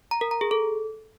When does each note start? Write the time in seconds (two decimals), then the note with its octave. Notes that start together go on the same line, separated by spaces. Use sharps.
0.11 A#5
0.21 A#4
0.31 A#5
0.41 G#4
0.51 A4